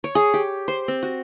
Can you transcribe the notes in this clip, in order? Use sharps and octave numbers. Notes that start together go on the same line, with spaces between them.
C#5
G#4
G4
C5
C4
F#4